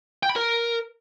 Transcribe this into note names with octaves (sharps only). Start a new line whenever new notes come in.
G5
B5
A#4